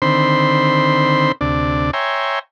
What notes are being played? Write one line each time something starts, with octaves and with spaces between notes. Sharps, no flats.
D3 D#3 C4 C5 B5 C6
D2 C3 D4 D5
C#5 E5 G5 G#5 A#5 C6